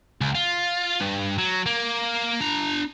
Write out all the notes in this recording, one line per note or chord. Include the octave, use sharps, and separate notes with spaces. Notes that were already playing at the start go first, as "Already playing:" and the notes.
C#2
F4
G2
F#3
A#3
D4 A#5